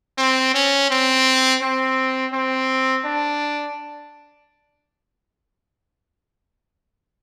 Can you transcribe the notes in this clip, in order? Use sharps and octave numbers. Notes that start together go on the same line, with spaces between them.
C4
C#4
C4
C4
C4
D4